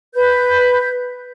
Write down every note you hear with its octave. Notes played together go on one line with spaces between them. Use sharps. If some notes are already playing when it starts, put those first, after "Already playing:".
B4 G6